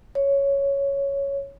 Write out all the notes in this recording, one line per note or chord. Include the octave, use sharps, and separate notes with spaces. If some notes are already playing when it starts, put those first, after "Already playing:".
C#5